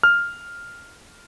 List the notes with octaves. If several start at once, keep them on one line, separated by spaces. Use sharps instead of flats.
F6